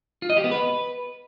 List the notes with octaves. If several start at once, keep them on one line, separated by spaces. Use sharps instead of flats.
F4
D#5
G4
B3
B4